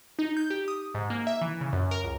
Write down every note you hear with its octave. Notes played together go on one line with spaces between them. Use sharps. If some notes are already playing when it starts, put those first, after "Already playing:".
D#4
G6
G4
D#6
G#2
A#3
E5
E3
C#3
F#2
A#4
C#2